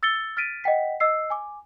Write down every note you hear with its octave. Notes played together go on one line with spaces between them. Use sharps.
E6 A6 C#7 G7
F6 A6 B6 D7 D#7
D#5 F#5 G5 B6
D#5 E6 C7
G#5 D6